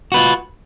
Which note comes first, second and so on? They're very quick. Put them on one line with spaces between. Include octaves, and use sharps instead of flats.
F#4 B4 F4